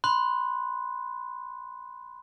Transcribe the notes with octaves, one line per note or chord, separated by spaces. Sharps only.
B5 C6 F#6